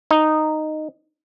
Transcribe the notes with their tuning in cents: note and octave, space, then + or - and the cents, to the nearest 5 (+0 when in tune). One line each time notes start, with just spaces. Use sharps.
D#4 -10